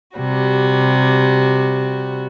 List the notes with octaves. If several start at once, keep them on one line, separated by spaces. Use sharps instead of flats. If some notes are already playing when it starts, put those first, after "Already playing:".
C3 G3 F#4